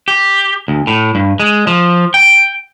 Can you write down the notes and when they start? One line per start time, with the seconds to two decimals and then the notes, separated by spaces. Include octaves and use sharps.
0.08 G4
0.68 D2
0.87 A2
1.15 G2
1.40 G#3
1.67 F3
2.14 G5